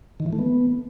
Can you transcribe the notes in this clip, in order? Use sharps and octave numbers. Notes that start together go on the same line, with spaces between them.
D#3
E3
A3
B3